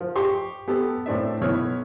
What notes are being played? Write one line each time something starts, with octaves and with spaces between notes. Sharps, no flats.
F3
G4 C6 C#6
B3 G4 A4
A2 C4 D4 E5
B1 B3 E4 C#5 C#6 F6